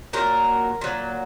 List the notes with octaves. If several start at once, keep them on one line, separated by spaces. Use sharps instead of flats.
A#2 F#3 A#4
A#2 F#3